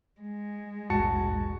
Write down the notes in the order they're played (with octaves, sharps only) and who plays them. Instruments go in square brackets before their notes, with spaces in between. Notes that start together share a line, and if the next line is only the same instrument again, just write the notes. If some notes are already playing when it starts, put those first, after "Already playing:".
[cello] G#3
[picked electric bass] E1 A#1 G#2 [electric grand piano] F#4 A5 C#7